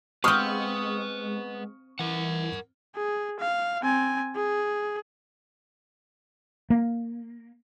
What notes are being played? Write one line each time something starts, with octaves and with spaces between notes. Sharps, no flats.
G#3 C4 B4 F5 F#5 C#6 D#6 F6
E3 A#4 F#5
G#4
F5
C4 G#5
G#4
A#3